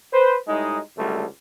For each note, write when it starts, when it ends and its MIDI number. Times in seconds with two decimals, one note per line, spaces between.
0.13 0.35 71
0.13 0.35 72
0.47 0.78 45
0.47 0.78 55
0.47 0.78 56
0.47 0.78 63
0.96 1.24 37
0.96 1.24 42
0.96 1.24 50
0.96 1.24 55
0.96 1.24 57